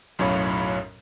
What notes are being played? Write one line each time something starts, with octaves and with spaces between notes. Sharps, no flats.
B1 F#2 A2 C#5 F5 B5